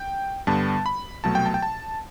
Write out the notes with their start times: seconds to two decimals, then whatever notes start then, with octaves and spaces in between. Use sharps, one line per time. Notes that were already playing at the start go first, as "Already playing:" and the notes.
Already playing: G5
0.47 G2 D3 G3 B3 A5
0.86 B5
1.24 C2 B2 F#3 A3 A5
1.35 G5
1.46 A5
1.54 G5
1.62 A5